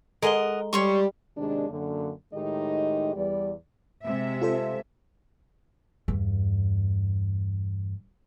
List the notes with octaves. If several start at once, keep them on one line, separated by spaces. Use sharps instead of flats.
G#3 A4 A#4 D#5 F#5 A#5 G7
G3 C#5 C6 C#6
D#2 C3 D#3 G#3 D4
F#2 D3 A#3
A2 D#3 G#3 D#4 G4 D#5
E2 G3 D5
C3 G#3 E5
F4 A4 C5
E2 G2